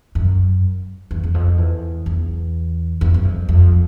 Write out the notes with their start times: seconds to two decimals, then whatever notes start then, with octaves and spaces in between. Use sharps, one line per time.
0.15 F#2
1.11 E2
1.24 E2
1.34 F2
1.58 E2
2.06 E2
3.01 E2
3.14 F#2
3.25 F2
3.49 F2